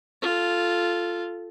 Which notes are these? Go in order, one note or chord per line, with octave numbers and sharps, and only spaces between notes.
F4 A4